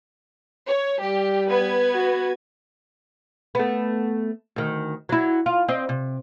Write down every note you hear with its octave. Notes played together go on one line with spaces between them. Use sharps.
C#5
G3 G4
B3 B4 G#6
F#4
A3 B3
D2 D#3
F#3 E4
F4
C4 D#5
C3